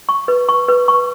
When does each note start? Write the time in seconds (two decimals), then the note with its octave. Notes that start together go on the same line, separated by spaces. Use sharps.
0.09 C#6
0.28 B4
0.48 C#6
0.69 B4
0.88 C#6